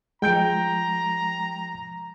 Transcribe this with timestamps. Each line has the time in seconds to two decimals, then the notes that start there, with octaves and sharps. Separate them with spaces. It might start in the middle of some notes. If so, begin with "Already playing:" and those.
0.22 F3 G#3 G5 A#5 G6 D7